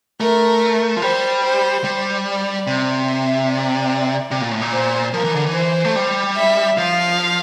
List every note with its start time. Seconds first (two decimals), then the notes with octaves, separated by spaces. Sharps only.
0.20 A3 A#4
0.97 F3
1.02 G3 C5
1.43 C5
1.84 G3
2.25 D5
2.67 C3
3.08 E5
3.49 D5
4.31 C3
4.41 A#2
4.51 A2
4.62 A#2
4.72 C5
5.13 F3 A#4
5.24 E3
5.35 D3
5.46 E3
5.53 C5
5.85 A3
5.96 G3
6.36 E5
6.77 F3 F5